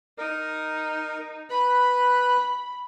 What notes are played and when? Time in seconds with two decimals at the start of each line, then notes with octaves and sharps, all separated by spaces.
0.18 D#4 A#4
1.50 B4 B5 F#6